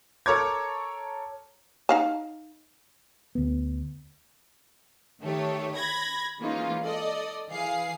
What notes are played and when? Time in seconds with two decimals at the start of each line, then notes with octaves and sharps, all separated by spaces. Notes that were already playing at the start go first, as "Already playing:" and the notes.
0.26 A4 A#4 C#5 A#5 D6 G#6
1.89 D#4 F5 A5
3.35 D2 B3
5.21 D#3 A3 G4 C#5
5.75 B5 G#6 A#6
6.39 E3 G#3 A#3 C#4 D#4 F4
6.82 A4 D5 D#5
7.49 E3 G#4 F5 C7